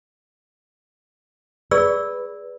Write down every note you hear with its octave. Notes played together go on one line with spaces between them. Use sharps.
G#4 B4 D5 E6